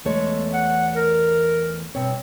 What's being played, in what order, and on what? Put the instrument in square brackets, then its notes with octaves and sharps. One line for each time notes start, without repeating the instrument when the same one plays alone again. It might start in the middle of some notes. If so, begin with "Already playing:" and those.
[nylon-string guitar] E2 A3 C#5 [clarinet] G#3
[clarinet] F#5
A#4
[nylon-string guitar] G2 B2 C#5 [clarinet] C4